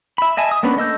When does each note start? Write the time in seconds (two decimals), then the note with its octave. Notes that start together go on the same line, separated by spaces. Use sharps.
0.18 E5 B5
0.37 D#5 E5 G#5 A5
0.51 D#6
0.63 A#3 B3 C#4 D4 B4
0.77 A3 D#5 E6 G6